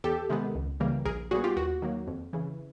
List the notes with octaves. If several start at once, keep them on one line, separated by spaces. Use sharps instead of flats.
E2 G4 A4
C3 D#3 G#3 B3
C#2
C#3 E3 G3 A#3
A#1 G#4 A#4
A#2 G3 B3 F#4 G#4
F4 G4
D#2 F#4
D#3 F#3 A#3
F2
C#3 E3